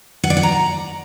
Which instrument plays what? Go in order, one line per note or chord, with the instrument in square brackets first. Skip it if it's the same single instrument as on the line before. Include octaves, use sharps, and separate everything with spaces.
[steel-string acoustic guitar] F#5
D5
F#5
A#5